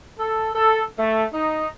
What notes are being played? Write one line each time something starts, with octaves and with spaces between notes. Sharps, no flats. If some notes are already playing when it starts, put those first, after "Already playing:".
A4
A4
A3
D#4